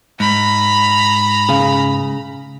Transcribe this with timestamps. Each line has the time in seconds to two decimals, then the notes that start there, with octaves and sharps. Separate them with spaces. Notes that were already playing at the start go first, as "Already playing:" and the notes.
0.20 G#2 A#5 B5
1.49 C#3